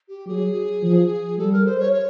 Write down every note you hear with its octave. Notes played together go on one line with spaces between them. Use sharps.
G4
F#3 G#4
F3
G3 A4
A#4
C5
C#5
C#5